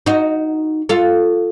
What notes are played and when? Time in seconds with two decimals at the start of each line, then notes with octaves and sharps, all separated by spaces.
0.06 D#4 F#4
0.89 F4 A4